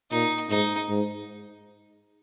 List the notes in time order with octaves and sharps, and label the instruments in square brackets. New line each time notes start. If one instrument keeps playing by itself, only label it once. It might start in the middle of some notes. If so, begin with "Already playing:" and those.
[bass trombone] A#2 [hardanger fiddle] D#4
[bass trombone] G#2 [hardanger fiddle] D#4
[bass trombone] G#2